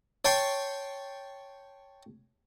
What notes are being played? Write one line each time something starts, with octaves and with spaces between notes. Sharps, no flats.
C#5 G5 A5 C6 C#6